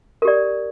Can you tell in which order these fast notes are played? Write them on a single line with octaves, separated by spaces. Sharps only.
A#4 G4 D5